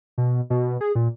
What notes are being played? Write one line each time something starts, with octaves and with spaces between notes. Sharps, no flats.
B2
B2
G#4
A#2